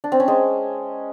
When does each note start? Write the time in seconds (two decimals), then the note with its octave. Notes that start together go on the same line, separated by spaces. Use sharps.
0.04 D4
0.12 C4
0.20 C#4
0.28 G#3